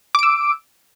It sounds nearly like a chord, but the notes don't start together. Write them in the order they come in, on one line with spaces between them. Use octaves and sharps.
D6 D7 E6